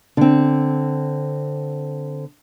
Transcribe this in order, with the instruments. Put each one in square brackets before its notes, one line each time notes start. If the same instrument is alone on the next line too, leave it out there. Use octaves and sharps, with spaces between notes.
[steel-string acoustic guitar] D3 C4